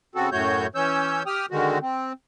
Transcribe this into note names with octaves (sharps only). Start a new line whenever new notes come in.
C#3 C4 F#4 A4
F#2 A2 A3 F#4 C#5 G6
E3 C#4 C#5 E6 G6
G4 G5 D#6 F6
D3 D#3 G#3 F#4
C4